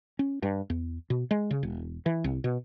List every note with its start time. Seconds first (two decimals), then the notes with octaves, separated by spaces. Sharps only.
0.19 C#4
0.43 G2
0.70 E2
1.10 B2
1.31 G#3
1.51 C#3
1.63 E1
2.06 E3
2.24 C2
2.44 B2